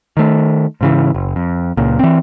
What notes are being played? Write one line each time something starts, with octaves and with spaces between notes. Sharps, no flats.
D#3 A3
G#2 C#3 E3
F#1
F2
C#2 A#2
E3 C4